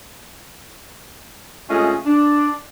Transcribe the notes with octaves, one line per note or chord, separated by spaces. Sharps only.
C3 G#3 A3 C#4 F4 D#5
D4